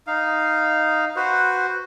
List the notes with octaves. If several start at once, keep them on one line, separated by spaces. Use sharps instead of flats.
D#4 F5
F#4 B4 C5